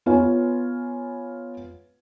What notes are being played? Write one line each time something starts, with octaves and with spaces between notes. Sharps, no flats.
B3 F4 B4 C#5 G#5